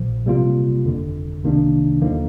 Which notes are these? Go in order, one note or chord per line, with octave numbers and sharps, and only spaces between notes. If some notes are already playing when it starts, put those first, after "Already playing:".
Already playing: A#1 A#2 F3
C3 G3 A#3 F4
G1 F2 D3
C2 C3 D#3 A#3 D4
D#2 D3 F3 A#3 D#4